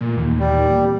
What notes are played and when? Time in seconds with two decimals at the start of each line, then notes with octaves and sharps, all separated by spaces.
0.01 A#2 A3 A#3
0.17 D#2 A#2 E3 A#3
0.39 G3
0.80 G#3 C4